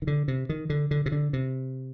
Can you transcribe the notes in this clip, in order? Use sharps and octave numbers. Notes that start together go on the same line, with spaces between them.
D#3
D3
C3
D#3
D3
D3
C3
D3
C3